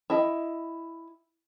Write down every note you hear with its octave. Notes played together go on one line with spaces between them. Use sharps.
E4 D#5